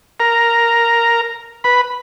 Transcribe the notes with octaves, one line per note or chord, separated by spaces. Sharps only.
A#4 A#5
B4 B5